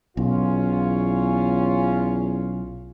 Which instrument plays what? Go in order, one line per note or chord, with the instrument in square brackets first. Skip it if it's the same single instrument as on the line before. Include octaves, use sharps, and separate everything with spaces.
[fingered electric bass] B1 [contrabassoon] E2 [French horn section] C#4 F4